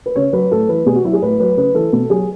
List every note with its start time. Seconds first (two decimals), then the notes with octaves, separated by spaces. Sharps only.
0.06 B4
0.16 C#3 C#5
0.33 F#3 B4
0.51 A2 A4
0.69 E3 B4
0.86 B2 G#4
0.96 F#4
1.05 F#3 E4
1.13 G#4
1.22 A2 B4
1.40 F#3 B4
1.57 C#3 B4
1.75 E3 A4
1.93 B2 A4
2.10 F#3 G#4